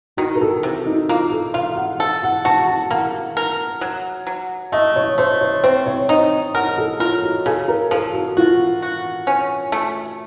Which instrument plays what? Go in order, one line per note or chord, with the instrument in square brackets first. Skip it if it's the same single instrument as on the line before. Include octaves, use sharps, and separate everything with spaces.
[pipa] D#3 [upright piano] F#4
[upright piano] A#4
A4
[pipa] C3 [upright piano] F#4
[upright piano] D#4
[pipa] A#3 [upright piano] F4
[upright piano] A4
[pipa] F4 [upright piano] F5
[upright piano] F#5
[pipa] A4
[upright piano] F#5
[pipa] F#4 [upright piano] A5
[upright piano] A5
[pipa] A#3 [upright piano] F#5
[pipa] A#4
F#3
F#3
[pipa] A3 [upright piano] D#5
[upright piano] C#5
[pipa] A3 [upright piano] C5
[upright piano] C#5
[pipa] C4 [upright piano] C5
[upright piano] C#5
[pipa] D#4 [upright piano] D#5
[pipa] A#4 [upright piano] F#5
[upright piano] A4
[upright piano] F4 [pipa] A#4
[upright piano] F#4
[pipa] C#3 [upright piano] A4
[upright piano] A#4
[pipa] F3 [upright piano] A4
[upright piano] F#4
[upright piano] F4 [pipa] F#4
[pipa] F#4
C#4
A3